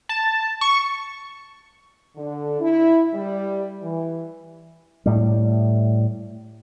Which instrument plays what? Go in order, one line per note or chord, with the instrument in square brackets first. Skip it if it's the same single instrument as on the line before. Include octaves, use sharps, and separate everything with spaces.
[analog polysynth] A5
C#6
[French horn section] D3
E4
G3
E3
[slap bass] A2 G3